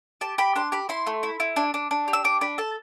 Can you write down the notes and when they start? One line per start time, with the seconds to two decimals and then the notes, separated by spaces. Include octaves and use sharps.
0.21 G4 A5
0.38 G4 B5
0.56 D4 C6
0.72 G4 B5
0.89 E4 C6
1.06 A3
1.23 E4
1.40 E4
1.56 D4
1.74 D4
1.91 D4
2.08 G4
2.13 E6
2.24 D4 D6
2.41 D4 B5
2.58 A4 A5